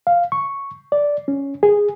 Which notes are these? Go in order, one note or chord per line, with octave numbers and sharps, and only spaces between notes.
F5
C#6
D5
C#4
G#4